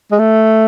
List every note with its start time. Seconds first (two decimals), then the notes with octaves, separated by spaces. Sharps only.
0.11 G#3
0.19 A3